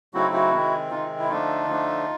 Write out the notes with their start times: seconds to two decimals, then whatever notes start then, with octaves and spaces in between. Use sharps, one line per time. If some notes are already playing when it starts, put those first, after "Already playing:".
0.14 C#3 F#3 A3 C4 D#4 E4 F#4
0.33 E4 F#4
0.52 C3 D#3 G#3 C4
0.91 C3 D#3 G#3 C4 D#4 F4
1.19 E4
1.28 D3 F3 A3 D4 D#4 F4
1.67 D3 F3 A3 D4